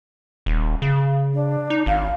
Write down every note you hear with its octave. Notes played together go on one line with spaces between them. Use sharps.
D#1
C#3
D4
D#4
G#1 F5